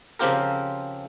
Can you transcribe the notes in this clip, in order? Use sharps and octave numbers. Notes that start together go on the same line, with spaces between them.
C#3 F3 C4 F4 G4 A#4